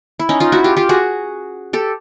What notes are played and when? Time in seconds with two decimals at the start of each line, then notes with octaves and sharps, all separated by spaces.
0.20 E4
0.29 C#4 D#4
0.40 D#4 F4
0.52 E4 F#4
0.64 F4 G4
0.77 F4 G4
0.89 F#4 G#4
1.73 G4 A4